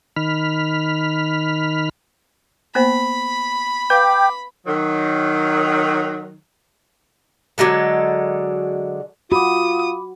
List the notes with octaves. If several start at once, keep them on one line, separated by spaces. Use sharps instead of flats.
D#3 B5 F6
A#3 B3 C5 B5
B4 F5 G5 D6
D#3 F#3
D3 F#3 G#3 A4
F4 F#4 B5 D6 D#6